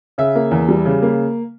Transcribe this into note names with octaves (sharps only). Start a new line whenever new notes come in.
C#3 E5
A#3
E2
G3
C#3
A#3